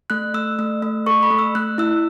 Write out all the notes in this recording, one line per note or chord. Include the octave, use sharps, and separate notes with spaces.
A3 F#6
A3 E6
A3
A3
A4 C#6
B5
A3
E6
A3 F#6
E4 E6